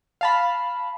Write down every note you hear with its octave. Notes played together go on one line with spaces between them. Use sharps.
F5 A5 B5